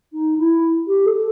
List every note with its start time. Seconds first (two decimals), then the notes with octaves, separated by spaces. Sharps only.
0.12 D#4
0.37 E4
0.87 G4
1.06 A4